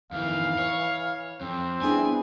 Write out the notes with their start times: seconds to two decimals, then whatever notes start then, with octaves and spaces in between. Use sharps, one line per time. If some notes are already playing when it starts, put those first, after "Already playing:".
0.12 F2 D#3 E3 F5
0.58 C#5
1.41 F2 C4
1.81 G3 B3 D4 E4 G#4 G#5